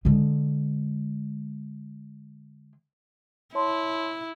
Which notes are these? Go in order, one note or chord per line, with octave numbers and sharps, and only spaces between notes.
D3 G#3
E4 C#5 A5 C6